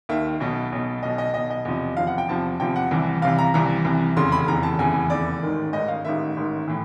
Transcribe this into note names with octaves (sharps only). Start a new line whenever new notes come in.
D#2 D#3 E5
B1 B2
B1 B2
B1 B2 D#5
D#5
B1 B2 D#5
D#5
E2 C3 F3
E2 C3 F3 F5
F#5
G5
E2 C3 F3 A5
E2 C3 F3 G5
F#5
C2 C3 E3
C2 C3 E3 F5
A#5
C2 C3 E3 A#5
C2 C3 E3
F1 E2 C#3 E3 C6
B5
F1 E2 C#3 E3 A#5
A5
F1 E2 C#3 E3 G#5
F1 E2 C#3 E3 D5
A1 G#2 D#3
A1 G#2 D#3 D#5
F5
A1 G#2 D#3 E5
A1 G#2 D#3
A2 E3